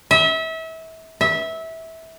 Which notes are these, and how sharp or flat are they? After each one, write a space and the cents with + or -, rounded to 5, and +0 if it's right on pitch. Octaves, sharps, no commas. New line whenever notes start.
E5 -30
E5 -20